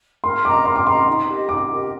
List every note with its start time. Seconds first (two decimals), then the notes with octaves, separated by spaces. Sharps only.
0.24 A#4 C6
0.45 D#5 A#5 D6
0.65 A#4 C6
0.76 D6
0.86 D#5 A#5 C6
1.08 D#4
1.28 G4 A#4 D#5
1.49 D#4 D6
1.70 G4 A#4 D#5